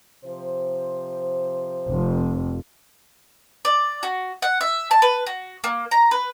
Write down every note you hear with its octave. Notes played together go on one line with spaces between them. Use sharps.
C3 F3 C5
F1 F2
D5
F#4
F#5
E5
A5
B4
F#4
A#3
A#5
B4